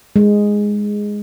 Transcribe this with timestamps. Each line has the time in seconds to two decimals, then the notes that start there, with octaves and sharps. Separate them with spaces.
0.16 G#3